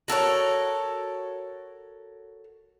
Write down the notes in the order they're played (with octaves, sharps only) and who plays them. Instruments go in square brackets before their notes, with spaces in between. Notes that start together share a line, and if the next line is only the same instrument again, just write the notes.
[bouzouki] F#4 A4 A#4 C#5